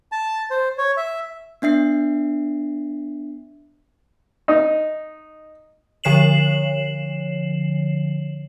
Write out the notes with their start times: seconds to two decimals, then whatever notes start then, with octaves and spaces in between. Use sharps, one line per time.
0.12 A5
0.50 C5
0.78 C#5
0.97 E5
1.62 B3 D4 E5 C7
4.48 D#4
6.04 D3 F3 C#5 C7 E7 F#7